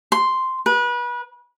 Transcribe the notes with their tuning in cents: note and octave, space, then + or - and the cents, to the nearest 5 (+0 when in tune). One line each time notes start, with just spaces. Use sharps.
C6 -5
B4 -30